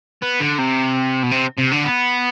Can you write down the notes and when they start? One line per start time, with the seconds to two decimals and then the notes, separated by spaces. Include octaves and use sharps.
0.22 B3
0.40 D3
0.58 C3
1.23 B2
1.31 C3
1.58 C3
1.72 D3
1.84 B3